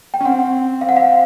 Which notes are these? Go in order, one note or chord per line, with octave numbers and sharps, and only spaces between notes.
G5
C#4
C4 F#5
F5
F#5
F5